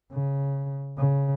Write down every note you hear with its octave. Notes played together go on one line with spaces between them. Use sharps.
C#3
C#3